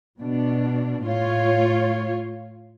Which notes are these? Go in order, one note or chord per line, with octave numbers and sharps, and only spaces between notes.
B2 D4
A2 F4 C#5